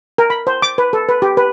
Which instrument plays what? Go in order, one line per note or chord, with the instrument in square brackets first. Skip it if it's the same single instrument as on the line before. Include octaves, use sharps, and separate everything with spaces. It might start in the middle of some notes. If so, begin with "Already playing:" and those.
[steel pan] A#4
B5
C5
D6
B4
A4
B4
G4
B4